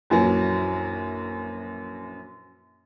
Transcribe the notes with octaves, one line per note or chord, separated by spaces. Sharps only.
A#1 F#2 E3 F#3